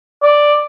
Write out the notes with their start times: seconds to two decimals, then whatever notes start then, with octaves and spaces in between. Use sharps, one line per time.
0.23 D5